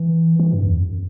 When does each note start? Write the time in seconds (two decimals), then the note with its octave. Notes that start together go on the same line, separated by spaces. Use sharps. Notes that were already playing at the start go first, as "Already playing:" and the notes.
Already playing: E3
0.40 E3
0.53 G2
0.66 E2
0.80 F#2